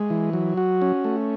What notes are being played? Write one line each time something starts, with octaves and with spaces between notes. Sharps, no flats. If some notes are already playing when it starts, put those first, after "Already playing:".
Already playing: G#3
E3
F#3
F#4
C#4
A3